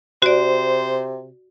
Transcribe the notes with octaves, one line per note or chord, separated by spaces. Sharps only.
C3 F#4 C5 D5